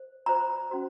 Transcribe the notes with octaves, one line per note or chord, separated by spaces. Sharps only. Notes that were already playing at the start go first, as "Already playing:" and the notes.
Already playing: C5
F4 C5 A#5
C#4 F#4 C5